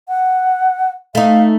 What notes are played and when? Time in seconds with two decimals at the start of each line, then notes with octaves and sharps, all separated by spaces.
0.09 F#5
1.15 A3 D#4 F5